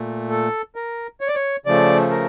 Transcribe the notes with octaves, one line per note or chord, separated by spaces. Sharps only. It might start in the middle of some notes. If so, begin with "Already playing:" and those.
Already playing: A#2 A3
A4
A#4
C#5
D5
C#5
C#3 F3 A3 D5
A#4